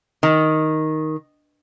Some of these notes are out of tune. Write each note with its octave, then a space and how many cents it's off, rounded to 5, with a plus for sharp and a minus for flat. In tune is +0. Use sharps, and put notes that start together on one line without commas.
D#3 +5